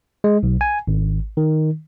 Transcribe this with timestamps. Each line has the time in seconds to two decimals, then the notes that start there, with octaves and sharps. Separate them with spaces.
0.24 G#3
0.43 B1
0.61 G#5
0.88 G#1
1.37 D#3